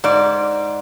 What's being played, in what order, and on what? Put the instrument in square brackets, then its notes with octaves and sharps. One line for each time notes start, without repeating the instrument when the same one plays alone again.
[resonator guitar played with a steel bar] G#2 D5